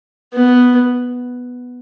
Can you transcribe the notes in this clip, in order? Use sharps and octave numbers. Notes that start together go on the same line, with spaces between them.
B3